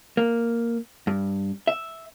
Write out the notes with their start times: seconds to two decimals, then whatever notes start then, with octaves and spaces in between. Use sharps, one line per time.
0.17 A#3
1.07 G2
1.67 E5